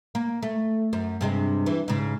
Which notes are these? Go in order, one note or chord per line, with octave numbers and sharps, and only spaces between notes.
A#3
A3
F#2
G2 C3 G#3
E3
G#2 C#3